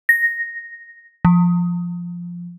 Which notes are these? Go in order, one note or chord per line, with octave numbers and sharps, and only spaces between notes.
A#6
F3